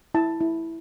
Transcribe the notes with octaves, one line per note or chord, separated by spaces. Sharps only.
E4 A5
E4